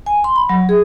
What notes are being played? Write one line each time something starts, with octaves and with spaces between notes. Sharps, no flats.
G#5
C6
B5
F#3
G#4